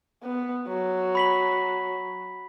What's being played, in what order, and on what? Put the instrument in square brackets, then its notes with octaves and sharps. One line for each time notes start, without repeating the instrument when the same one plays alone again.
[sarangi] B3
F#3
[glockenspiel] B5 B6 F#7